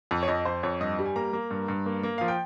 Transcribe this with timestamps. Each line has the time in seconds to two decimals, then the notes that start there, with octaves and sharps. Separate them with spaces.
0.11 F2
0.23 C#5
0.28 F2 D#5
0.45 F2 C5
0.63 F2 C#5
0.81 G2 D#5
0.99 G3
1.05 G#5
1.16 A#3 A#5
1.33 A#3
1.51 G2
1.68 G2
1.86 A#3
2.03 A#3
2.18 F3 F5
2.28 G5